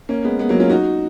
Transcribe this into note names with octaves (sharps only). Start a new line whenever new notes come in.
A#3 C#4
G#3 B3
G#3 B3
F#3 A#3
C#4 F4
D#4 F#4